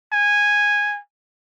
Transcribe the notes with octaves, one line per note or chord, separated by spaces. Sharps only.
G#5